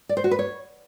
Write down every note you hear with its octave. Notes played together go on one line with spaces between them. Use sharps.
D5
C5
F#4
B4
C#5